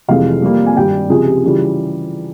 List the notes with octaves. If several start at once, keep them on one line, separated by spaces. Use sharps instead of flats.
F1 F2 C3 E3 G#3 F5
F2 C3 G3 A#3
G#5
G#1 G2 G3 G5
C#2 C3 F3 G#4
G4
C#3 E3 G3 F4